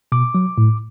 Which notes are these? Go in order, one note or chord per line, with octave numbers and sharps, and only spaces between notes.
B2 D6
F#3
A2